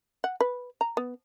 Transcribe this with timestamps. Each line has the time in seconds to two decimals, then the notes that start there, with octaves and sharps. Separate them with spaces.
0.24 F#5
0.41 B4
0.81 A#5
0.97 B3